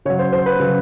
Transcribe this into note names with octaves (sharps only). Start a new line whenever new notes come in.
C#3 F#3 C#5
C5
C5
B4
C#3 F#3